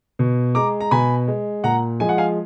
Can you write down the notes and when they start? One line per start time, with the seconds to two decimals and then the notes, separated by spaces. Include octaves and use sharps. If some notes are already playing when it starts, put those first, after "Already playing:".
0.19 B2
0.55 G#3 A#5 D6
0.81 A#5
0.91 B2 G#5 B5
1.28 G#3
1.64 A#2 F#5 A#5
2.00 F3 G#3 G#5
2.09 F#5
2.18 F5 G#5